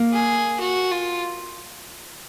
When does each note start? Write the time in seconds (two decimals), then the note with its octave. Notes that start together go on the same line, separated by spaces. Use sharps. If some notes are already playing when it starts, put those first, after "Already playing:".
Already playing: A#3
0.12 G#4
0.60 F#4
0.91 F4